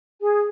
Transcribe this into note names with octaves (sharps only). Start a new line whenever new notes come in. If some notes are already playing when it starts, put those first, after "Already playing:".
G#4